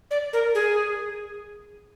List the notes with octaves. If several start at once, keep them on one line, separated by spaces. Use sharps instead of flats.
D5
A#4
G#4